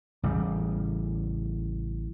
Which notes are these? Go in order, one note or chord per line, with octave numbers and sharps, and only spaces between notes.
A1 C#3 G3